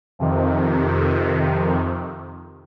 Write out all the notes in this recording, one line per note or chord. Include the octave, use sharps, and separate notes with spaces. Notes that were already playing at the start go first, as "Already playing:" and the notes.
F2 C3 D#3